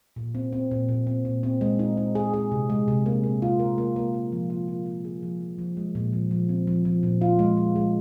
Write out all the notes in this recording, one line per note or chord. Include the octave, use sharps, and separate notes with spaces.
A#2
C4
C4
A#2
A#2
C4
A#2
C4
G#3
D#4
D#4
G#4
G#4
C3
G#3
C3
A#3
A#3
F4
A#4
A#3
A#3
A#4
F3
F4
F4
F4
G#4
F3
F3
F3
G#3
A#2
F3
F3
C4
F3
F3
A#2
F4
G#3
G#3
G#3